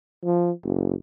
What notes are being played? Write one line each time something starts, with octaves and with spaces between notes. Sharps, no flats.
F3
F#1